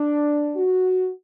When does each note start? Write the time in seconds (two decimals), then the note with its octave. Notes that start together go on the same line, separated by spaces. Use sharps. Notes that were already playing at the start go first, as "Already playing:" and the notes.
Already playing: D4
0.56 F#4